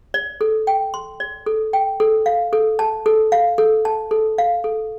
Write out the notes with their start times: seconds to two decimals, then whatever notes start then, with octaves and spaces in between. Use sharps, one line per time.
0.14 D5
0.41 A4
0.67 G5
0.94 C6
1.20 D5
1.46 A4
1.73 G5
2.00 A4
2.26 F5
2.53 A4
2.79 A5
3.06 A4
3.32 F5
3.58 A4
3.85 A5
4.11 A4
4.38 F5
4.64 A4